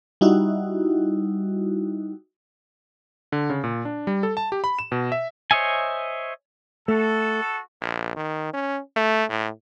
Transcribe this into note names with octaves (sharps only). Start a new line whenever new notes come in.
G3 D#4 E4 F#4
D3
C#3
A#2
D4
G3
A4
A5
G4
B5
E7
B2
E5
C5 C#5 D#5 E5 G#5
A3 F#4 A4
A#1
D#3
C#4
A3
A2